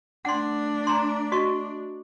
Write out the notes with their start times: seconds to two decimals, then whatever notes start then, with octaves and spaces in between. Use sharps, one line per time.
0.25 A3 D4 F#5 C6
0.87 A#5 C6
1.32 F#4 D#5 C#6